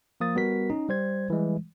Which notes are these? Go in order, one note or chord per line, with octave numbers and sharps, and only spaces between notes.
F3 A#3 D#6 A6
G3 B3 F#4 A#4 B6
C#4 D#4
G3 C5 G#6
E3 G3 G#3